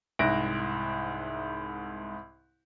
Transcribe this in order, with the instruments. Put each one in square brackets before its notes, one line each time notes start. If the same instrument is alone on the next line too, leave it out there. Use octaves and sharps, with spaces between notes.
[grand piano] C2 G#2 E5 F#6 A#6 D7